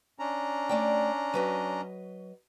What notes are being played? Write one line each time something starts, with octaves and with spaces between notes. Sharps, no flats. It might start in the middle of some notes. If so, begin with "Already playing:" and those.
C#4 D4 A#5
A3 D5 G5
F#3 B4 D#5